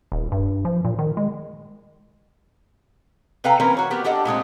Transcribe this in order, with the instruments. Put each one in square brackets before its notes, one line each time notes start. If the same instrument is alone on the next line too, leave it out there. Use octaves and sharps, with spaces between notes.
[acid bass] D#1
G2
F3
A#2
D#3
G#3
[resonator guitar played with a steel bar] C3 A4 B4 F5 G5 A#5
E3 A#3 C4 C#4 A#4 B4
F#4 C#5
B3 G4 A#4
D4 G4 A4 D#5 F#5
A#2 G#3 A3 C4